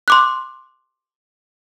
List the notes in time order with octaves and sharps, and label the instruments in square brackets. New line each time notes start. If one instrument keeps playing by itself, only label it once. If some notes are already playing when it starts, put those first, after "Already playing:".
[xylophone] C6 D6 F#6